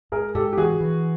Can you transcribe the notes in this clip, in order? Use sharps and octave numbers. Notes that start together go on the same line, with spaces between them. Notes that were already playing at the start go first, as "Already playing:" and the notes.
G#2 G#4 A#4
G#2 G4 A4
G4
E3 F#4 G#4
E3